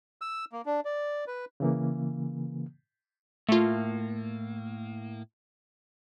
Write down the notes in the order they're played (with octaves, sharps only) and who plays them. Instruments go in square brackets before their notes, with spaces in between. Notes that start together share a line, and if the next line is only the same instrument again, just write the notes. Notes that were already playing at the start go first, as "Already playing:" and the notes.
[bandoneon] E6
A#3
D4
D5
B4
[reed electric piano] C#3 E3 A#3
[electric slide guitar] A2 A#3 [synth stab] A3 F4